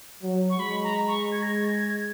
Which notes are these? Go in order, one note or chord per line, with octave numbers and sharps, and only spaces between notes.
F#3
C#6
G#3 B5
A#5
C#6
G#6
A#6
G#6
A#6
G#6